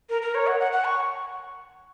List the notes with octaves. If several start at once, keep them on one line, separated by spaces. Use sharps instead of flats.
A#4
A#4
C#5
F#5
F#5
F#5
C#6